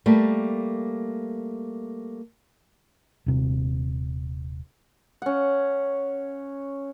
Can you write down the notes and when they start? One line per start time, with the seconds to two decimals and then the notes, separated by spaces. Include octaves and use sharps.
0.06 G3 A3 A#3
3.26 D#1 C3
5.22 C#4 F#5